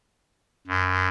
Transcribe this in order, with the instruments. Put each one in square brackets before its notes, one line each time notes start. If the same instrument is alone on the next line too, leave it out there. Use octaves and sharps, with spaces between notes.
[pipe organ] F#2